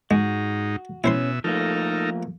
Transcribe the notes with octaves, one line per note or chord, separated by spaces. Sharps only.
G#2 G#3 D#4 F#4
B2 C#4 E4 C5 E5 C6
F3 A3 A#3 D#4 A4 A#4